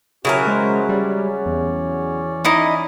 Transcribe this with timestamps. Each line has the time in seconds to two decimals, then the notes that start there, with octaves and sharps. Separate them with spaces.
0.25 C#3 F#3 C#4 E4 F#4 G4 A#4
0.47 G#3 C5
0.89 G3 C#4 C#5 D5
1.46 E2
2.45 D#4 E4 D#5